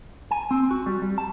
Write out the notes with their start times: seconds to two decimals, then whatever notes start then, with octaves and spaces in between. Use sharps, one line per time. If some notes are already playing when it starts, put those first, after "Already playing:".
0.31 G#5
0.51 C4
0.71 F#4
0.86 G3
1.02 G3
1.18 A5